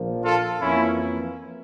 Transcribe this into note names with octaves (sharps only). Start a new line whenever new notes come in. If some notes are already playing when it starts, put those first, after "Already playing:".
Already playing: A#1 A#2 F3 A#3
F4 A4
F2 E3 A#3 C#4 E4